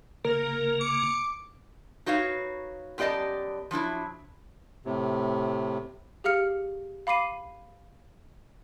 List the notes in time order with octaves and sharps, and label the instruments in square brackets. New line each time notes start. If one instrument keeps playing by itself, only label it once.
[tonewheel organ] C#3 A#3 [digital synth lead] A#4
[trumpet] D6 [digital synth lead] C#7
[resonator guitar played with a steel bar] D#4 F#4 B4 C#5 F5
F#2 B3 G4 D5 D#5 A5
F3 F#3 D4 E4
[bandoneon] A2 C3
[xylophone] G4 G#4 F5 F6 C#7
F5 B5 D6 C7 D#7